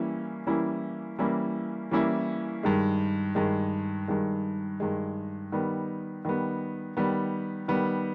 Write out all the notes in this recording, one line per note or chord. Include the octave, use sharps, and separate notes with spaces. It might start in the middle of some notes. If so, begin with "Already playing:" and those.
Already playing: E3 G3 A#3 C#4 E4
E3 G3 A#3 C#4 E4
E3 G3 A#3 C#4 E4
E3 G3 A#3 C#4 E4
G2 D#3 G#3
G2 D#3 G#3
G2 D#3 G#3
G2 D#3 G#3
D#3 G3 B3
D#3 G3 B3
D#3 G3 B3
D#3 G3 B3